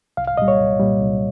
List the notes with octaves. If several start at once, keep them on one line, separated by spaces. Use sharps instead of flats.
C2 F5
F5
A#2 G3 D#5
C#5
C2
A#2 G3
C2